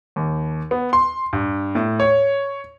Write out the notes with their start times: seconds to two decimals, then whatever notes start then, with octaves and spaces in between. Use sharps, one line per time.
0.16 D#2
0.71 B3
0.93 C6
1.33 G2
1.75 A2
2.00 C#5